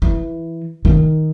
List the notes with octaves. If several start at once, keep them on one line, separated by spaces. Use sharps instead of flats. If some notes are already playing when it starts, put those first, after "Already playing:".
E3
D#3